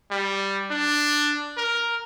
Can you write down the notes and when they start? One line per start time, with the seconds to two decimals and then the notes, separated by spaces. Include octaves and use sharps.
0.11 G3
0.71 D4
1.57 A#4